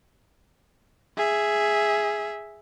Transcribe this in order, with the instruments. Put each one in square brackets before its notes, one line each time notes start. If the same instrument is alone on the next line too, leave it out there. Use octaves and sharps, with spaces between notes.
[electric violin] G#4 E5